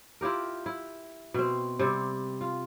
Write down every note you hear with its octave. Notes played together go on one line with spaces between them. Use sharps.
E4 F4 G4 A#4
E4
B2 C4
C3 G3 C4
F4